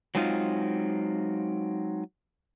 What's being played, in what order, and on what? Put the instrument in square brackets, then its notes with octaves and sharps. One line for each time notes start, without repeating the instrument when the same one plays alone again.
[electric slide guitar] F#3 G#3 C4 D#4 F4